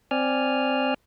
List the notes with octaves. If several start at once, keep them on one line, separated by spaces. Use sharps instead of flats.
C4 D5 G#5 F6